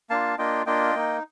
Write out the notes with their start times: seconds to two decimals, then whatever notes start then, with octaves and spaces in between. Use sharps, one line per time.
0.10 A#3 D4 F4 F5 A5
0.38 A#3 D4 F4 D#5 G5
0.66 A#3 D4 F4 D#5 G5
0.95 A#3 D#4